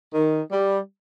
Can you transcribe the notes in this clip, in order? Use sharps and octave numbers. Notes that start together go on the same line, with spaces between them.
D#3
G3